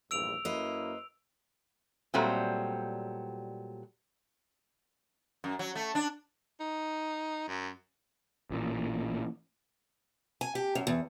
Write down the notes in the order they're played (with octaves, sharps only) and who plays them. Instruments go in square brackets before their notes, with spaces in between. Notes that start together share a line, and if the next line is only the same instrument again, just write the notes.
[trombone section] A#1 E2 G2 [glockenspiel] E6 D7 F7
[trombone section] F#2 A#3 E4 [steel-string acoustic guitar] B4 C5 D#5
[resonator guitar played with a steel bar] A#2 F#3 G3 A3 C4
[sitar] F#2
F#3
A3
D4
[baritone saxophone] D#4
F#2
[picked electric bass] A1 A#2
[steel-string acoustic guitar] G#5
G4
F#2
E2